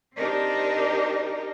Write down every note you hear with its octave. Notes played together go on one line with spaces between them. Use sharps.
C4 D4 D#4 G4 A#4 C5